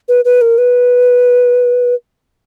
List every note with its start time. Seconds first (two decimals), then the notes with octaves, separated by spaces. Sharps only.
0.08 B4
0.25 B4
0.41 A#4
0.58 B4